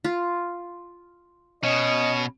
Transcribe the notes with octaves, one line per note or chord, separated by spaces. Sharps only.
F4
B2 C#4 D#5